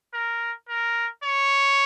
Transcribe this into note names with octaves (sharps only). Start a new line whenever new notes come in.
A#4
A#4
C#5